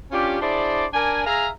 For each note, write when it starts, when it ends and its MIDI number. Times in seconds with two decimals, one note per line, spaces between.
0.12 0.40 61
0.12 0.40 62
0.12 0.40 65
0.12 0.40 67
0.41 0.85 62
0.41 0.85 64
0.41 0.85 68
0.41 0.85 72
0.41 0.85 74
0.93 1.24 62
0.93 1.24 70
0.93 1.24 74
0.93 1.24 80
1.26 1.49 68
1.26 1.49 76
1.26 1.49 77
1.26 1.49 82